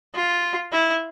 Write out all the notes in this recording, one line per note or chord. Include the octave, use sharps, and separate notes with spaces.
F4
E4